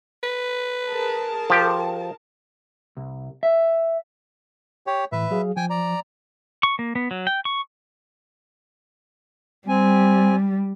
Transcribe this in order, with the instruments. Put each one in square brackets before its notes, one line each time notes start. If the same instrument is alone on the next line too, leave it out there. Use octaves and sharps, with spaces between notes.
[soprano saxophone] B4
[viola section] G#4 A#4 A5
[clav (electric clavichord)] F3 G4
[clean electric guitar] C2
E5
[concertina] G4 C#5
[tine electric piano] A2 E3 [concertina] B4 E5
[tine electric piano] F#3 G#4 F5
[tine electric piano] F3 [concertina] G5 G#5
[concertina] D5 A#5
[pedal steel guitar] C#6
A#3
B3
F#3
G5
C#6
[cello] G3 [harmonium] C4 G#5